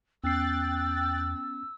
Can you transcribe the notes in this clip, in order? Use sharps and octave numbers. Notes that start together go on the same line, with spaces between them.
E2 B3 C#4 G5 E6 F#6 A6 C7